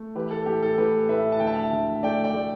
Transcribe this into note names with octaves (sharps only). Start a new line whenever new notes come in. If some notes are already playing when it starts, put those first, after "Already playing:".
Already playing: A3
E3 G4 B4
A4
A2 G4
A4
A3 G4 B4
A2 B4 E5
A5
D2 G5
E5 A5
D2
A3 D5 G5
D5 G5
A3